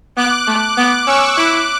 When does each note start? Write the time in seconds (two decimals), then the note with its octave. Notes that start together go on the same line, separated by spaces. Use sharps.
0.17 B3 D6 F#6
0.47 A3
0.77 B3 D6 F#6
1.06 C#4 C#6 E6
1.37 E4 D6 F#6